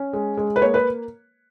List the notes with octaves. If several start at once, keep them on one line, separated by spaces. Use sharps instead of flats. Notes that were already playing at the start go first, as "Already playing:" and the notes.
Already playing: C#4
G#3
G#3
B4
A#3 C#5
B4